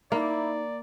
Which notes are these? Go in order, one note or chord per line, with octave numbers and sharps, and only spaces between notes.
A#3 D#4 E4 D5